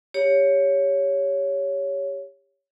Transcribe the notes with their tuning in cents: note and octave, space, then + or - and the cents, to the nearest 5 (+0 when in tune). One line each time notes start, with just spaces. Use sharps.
G4 +25 C#5 +10